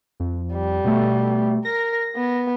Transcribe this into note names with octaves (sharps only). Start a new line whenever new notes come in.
F2
G3
B2 A3
A#4 A#6
B3